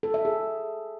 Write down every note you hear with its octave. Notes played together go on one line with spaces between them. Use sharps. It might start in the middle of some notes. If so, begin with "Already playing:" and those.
A4
E5
G#4